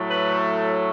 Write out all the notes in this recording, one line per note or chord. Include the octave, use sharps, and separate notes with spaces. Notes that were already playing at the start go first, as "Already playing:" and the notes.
Already playing: A2 F#3 A3
B4